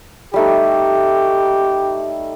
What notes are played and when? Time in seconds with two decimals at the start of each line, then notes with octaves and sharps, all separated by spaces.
0.34 G3 A3 D#4 G4